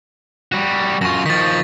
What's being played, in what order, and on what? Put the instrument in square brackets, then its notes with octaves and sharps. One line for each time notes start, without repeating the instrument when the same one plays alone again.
[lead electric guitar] G3 F#4
[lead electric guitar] F#2 F4 [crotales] C#6 A#6
[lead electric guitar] D#3 F3 [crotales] A6 B6